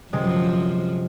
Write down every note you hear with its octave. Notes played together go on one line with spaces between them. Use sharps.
F#2 C3 F3 G#3